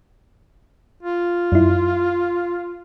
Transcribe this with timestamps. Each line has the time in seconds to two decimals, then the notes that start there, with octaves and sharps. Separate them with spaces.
1.03 F4
1.52 F#2 E4